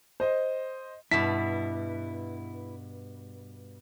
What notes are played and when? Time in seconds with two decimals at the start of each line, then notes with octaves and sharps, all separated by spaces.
0.20 C5 D#5
1.11 G2 B2 E4 A5 B6